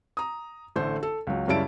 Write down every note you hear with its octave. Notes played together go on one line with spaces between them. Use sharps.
A#5 D#6
A1 D3 A3 C5
A4
C#2 F#3
F#2 C#3 G3 E4 A5 D7